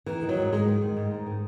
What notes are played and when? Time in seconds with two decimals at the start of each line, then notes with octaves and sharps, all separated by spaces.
0.06 D#3 E3
0.22 D#3
0.29 F#3
0.37 G#2
0.52 G#2 G#3
0.67 D#3
0.82 D#3
0.97 G#2
1.11 G#2
1.26 D#3